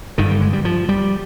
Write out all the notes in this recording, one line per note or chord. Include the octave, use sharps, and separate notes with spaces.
G1 G2 D3 D#3
G3
G#3
G3
F3
G3